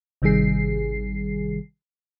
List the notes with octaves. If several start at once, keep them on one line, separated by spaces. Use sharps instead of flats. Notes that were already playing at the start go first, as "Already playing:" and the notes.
G#1 C3 D#3 G3 G#4 C7